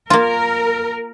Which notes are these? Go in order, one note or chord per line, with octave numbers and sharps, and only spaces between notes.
A#3 F4 A#4